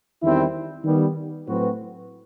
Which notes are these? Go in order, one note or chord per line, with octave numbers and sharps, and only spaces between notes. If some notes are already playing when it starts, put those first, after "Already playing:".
E2 D#3 G3 C4 E4
D#3 G3 B3
A2 F#3 C4 F#4 B4